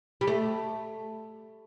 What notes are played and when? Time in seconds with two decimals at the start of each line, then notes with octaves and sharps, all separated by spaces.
0.21 G3
0.27 A3